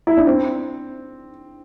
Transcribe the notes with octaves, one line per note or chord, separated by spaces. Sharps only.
E4
D4
C4